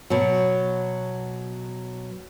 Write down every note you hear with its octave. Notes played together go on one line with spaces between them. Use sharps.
B2 F#3